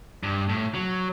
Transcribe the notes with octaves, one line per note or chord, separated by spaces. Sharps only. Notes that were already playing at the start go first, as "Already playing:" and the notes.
G2
A2
F#3